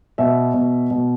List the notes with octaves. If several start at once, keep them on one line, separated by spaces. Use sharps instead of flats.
B2 E5
B2
B2